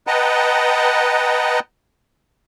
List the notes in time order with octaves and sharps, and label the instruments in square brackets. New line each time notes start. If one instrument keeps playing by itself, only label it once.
[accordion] B4 D#5 F#5 G5 A5 A#5